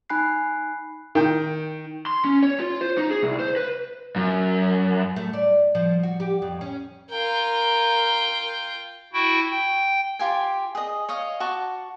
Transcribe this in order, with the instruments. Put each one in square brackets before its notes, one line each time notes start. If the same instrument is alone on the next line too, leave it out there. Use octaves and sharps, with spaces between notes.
[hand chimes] D#4 G#5 B5 F#6 C7
[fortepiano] D#3 G5
[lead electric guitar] C6
C#4
C#5
F4
C5
D#4
G#4
C2
C5
B4
F#2
[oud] A3
D5
F3
F#4
G4
F2
C#4
[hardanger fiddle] F4 G5 [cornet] A#4
[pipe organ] E4 F#4 G5
G5
[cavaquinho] F4 G4 G#5
G#4 D#5
C#5 D#5 F5
F#4 A5 C#6 D6